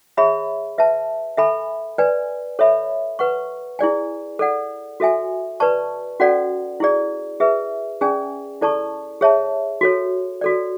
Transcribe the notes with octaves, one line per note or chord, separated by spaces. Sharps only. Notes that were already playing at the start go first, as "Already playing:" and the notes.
G#4 C#5 E5 B5
B4 E5 A5
A4 E5 G#5 B5
B4 D5 G#5
A4 C#5 E5 B5
B4 F#5 C#6
E4 G#4 D5 G#5
A4 D5 F#5
F#4 A4 E5 G#5
B4 D5 A5 C#6
C#4 F#4 A4 D5 F#5
E4 G#4 D5
G#4 B4 E5
C#4 G#4 D5 G#5
E4 A4 D5 A5 C#6
G#4 C#5 E5 A5
F#4 A4 C#5
F#4 A4 D5